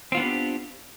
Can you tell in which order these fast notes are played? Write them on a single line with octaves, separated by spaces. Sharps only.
C4 F4 B3 D4 G4